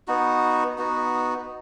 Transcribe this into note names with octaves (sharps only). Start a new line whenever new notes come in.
B3 D#4 F#4
B3 D#4 F#4